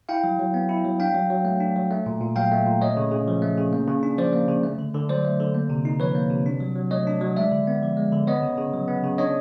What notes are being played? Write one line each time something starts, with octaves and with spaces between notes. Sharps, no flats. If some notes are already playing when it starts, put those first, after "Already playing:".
E4 F5 G5
F#3
F#3
B3
E4
F#3
D4 F5 G5
F#3
F#3
A3
D4
F#3
A3
A#2
A#2
F#3 F5 G5
A3
A#2
A3 C#5 D#5
C#3
C#3
F3
A3
C#3
A#3
C#3
D4
F3 C5 D5
A#3
C#3
A3
D3
D3
F#3 C5 D5
A3
D3
A#3
C3
D#4
F3 B4 C#5
A#3
C3
D4
F#3
F#3
A3 C#5 D#5
D4
F#3
G#3 D5 E5
D3
B3
F3
G#3
D3
B3 C#5 D#5
C#3
C#3
F#3
B3
C#3
D4 C#5 D#5